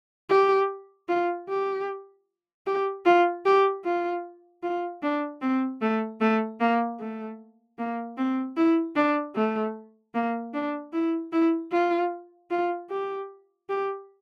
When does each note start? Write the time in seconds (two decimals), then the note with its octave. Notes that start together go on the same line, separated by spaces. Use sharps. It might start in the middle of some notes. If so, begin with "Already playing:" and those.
0.30 G4
1.09 F4
1.48 G4
2.66 G4
3.05 F4
3.45 G4
3.84 F4
4.63 F4
5.02 D4
5.41 C4
5.81 A3
6.21 A3
6.60 A#3
7.00 A3
7.78 A#3
8.17 C4
8.57 E4
8.96 D4
9.35 A3
10.14 A#3
10.54 D4
10.93 E4
11.32 E4
11.72 F4
12.50 F4
12.90 G4
13.69 G4